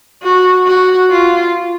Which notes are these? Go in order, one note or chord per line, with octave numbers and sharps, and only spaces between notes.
F#4
F#4
F4